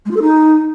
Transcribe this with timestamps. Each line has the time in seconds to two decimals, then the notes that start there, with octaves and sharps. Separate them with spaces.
0.05 G#3
0.11 F4
0.16 A4
0.22 D#4